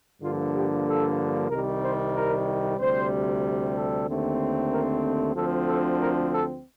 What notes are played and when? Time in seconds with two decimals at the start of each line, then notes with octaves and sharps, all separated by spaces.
0.22 G2 D3 F3 A#3 F4
0.54 G4
0.86 A4
1.50 C2 C3 D#3 G3 A#4
1.83 C5
2.15 A#4
2.78 D2 C3 G3 C5
3.75 A4
4.07 D#2 D3 A3 C4
4.71 A#4
5.35 D2 D3 F3 C4 A4
5.67 A4
5.99 A#4
6.31 A4